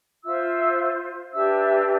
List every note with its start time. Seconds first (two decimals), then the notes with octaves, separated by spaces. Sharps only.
0.24 F4 C5 E5 E6
1.32 D4 G4 B4 E5 E6